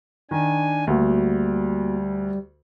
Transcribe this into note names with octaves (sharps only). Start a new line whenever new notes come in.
D#3 D4 G#5
D2 G3 A#3 F#4